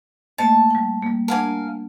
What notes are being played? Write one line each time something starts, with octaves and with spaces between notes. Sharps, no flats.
A3 A#3 D#5 A5
G3 G5
G3 A#3
D4 A#4 F5 F#5 G#5 A5